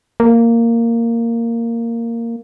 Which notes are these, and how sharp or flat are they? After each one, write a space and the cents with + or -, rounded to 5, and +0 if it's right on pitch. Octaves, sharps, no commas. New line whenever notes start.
A#3 -10